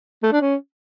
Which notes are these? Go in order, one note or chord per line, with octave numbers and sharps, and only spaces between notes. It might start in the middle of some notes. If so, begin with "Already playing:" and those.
A3
D4
C#4